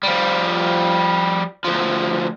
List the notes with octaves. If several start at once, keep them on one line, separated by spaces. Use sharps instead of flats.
F3 G3
D2 F3